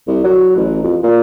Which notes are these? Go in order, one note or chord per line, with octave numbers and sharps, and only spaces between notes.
C2
F#3
A1
F2
A#2